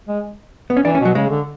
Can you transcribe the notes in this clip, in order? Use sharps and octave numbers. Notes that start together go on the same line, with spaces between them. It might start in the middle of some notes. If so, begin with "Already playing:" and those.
G#3
B3
C#4
E3 D4
C#4
B2
F#3
C#3 G#3
D3